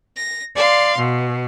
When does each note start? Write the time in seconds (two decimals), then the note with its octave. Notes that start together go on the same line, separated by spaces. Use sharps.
0.16 A#6
0.54 D5 F5 C6
0.97 B2